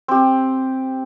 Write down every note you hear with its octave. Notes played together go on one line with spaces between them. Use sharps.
C4 G4